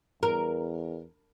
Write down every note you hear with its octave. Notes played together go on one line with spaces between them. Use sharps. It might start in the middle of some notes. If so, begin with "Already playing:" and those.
E2 A#4